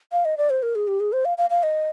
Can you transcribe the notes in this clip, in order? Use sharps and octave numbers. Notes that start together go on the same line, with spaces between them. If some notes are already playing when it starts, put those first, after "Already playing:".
F5
D#5
D5
C5
A#4
G#4
G4
G#4
C5
F5
F5
F5
D#5